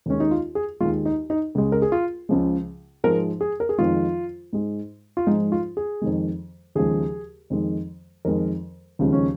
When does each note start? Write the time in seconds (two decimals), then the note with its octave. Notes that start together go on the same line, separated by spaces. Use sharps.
0.06 D#2 D#3 G#3 C#4
0.20 D#4
0.31 F4
0.55 G#4
0.80 D#2 D#3 G#3 F4
1.05 D#4
1.30 D#4
1.55 C#2 C#3 G#3
1.72 A#4
1.82 G#4
1.92 F4
2.29 C#2 C#3 F3 G#3
3.04 G#2 F3 G#3 A#4
3.41 G#4
3.60 A#4
3.69 G#4
3.78 F2 D#3 G#3 F4
4.53 G#2 G#3
5.17 F4
5.27 G#2 F3 G#3 D#4
5.52 F4
5.77 G#4
6.02 F2 D#3 G#3
6.75 D#2 C#3 F3 G#3 G#4
7.50 F2 D#3 G#3
8.25 F2 D#3 G#3 A#4
8.99 D#2 C#3 F3 G#3
9.12 C#4